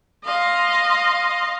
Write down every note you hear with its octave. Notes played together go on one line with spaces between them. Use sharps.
D#5 F5 C6